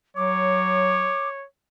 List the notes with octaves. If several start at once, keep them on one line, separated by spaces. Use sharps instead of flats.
F#3 C#5 D6